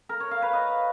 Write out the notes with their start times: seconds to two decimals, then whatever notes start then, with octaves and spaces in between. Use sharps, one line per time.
0.09 A#4
0.20 C#5
0.31 F5
0.42 B4
0.53 D#5